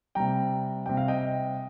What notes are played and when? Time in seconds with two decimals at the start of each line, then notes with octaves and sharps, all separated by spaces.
0.15 C3 G3 G5 A#5
0.86 C3 G3 G5
0.97 F5
1.08 D#5 G5